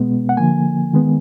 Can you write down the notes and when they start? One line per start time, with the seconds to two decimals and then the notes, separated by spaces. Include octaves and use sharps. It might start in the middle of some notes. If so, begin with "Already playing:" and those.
Already playing: B2 G#3 B3
0.29 F#5
0.37 D3 F3 A#3 G#5
0.93 D#3 G#3 B3